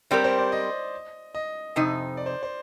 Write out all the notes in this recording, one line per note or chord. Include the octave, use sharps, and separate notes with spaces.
G3 C4 G4 A#4 D5
C5
D5
D#5
D#5
F2 C3 D#4
D5
C5
C5